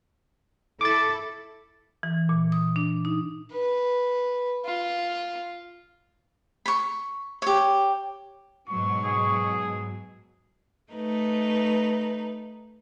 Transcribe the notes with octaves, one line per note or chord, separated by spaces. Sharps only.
E4 A4 D6 A6
E3
A#2
D#6
D4
D#4
B4
F4
B5 C#6
G4 C#5
G#2 B2 F#3 C#6
G#4
A3 D#4 B4